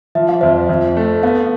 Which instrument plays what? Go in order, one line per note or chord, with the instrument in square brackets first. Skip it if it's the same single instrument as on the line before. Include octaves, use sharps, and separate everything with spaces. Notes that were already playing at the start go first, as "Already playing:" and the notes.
[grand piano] F3 [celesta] E5
[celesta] F5
[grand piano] F2 [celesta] C5 E5
[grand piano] F2
A3
[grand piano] B3 [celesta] F5